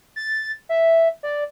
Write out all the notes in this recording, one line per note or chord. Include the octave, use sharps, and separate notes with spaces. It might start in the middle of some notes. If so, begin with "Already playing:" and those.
A6
E5
D5